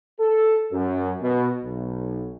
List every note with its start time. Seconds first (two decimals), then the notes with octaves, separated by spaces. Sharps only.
0.20 A4
0.73 F#2
1.22 B2
1.64 B1